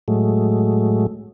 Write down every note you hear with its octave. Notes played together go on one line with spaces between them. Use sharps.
A2 F#3 G#3 A3